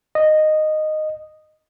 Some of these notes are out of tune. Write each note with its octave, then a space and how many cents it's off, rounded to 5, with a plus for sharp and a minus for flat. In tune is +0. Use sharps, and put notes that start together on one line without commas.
D#5 -10